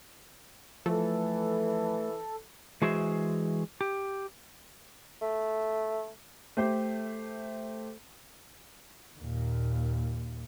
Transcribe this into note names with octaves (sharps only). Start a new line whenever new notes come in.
E3 F3 A3 A4
E3 G#3 F#4 G#4 C5 E5
G4
A3
A3 G4 C5
D#2 A#2